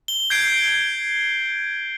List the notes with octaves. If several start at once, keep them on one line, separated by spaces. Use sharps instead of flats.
G7
G6 G#6 C7 D7